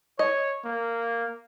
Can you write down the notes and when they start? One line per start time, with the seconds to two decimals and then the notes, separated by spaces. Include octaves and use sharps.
0.19 C#5 D#5
0.65 A#3